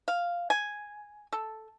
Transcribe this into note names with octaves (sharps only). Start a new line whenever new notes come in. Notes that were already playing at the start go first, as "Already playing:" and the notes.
F5
G#5
A4